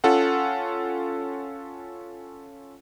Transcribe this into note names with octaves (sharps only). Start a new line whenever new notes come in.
C#4 F4 A4 F#5